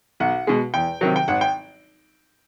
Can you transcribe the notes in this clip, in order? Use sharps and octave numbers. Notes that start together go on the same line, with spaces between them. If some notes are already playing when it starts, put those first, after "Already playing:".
B1 F#5
B2 G#3
E2 G5
C3 D#3 F#3
G5
G#1 F#5
G5